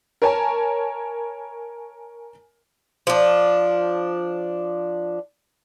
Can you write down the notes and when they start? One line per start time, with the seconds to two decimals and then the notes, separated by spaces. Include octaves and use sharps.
0.22 A#4 C#5 G#5 A5
3.07 F3 D4